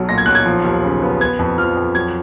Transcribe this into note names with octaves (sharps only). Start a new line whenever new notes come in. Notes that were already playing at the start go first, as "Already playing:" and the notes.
Already playing: B1 F#3
A#2 A#6
G#6
B1 F#6
G#6
F3
D#2
C#3
B3
B3 G#6
F2
F3 F6
F2
F#3 G#6